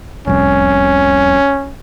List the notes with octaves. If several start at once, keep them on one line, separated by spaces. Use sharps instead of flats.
F1 C2 C#4